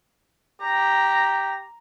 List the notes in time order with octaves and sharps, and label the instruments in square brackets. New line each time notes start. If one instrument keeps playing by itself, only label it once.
[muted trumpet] G4 [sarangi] A#5